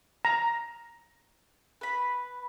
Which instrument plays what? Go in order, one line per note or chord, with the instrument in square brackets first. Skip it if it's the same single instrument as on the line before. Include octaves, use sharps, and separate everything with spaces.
[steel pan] A#5
[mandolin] B4 B5